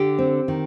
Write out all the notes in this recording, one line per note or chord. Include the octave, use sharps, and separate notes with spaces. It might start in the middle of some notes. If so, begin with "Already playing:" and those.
Already playing: D3 G4
C4
D#3